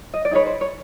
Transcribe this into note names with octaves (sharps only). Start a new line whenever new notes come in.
D#5
D5
D#4 G#4 B4 C#5
C5
C#5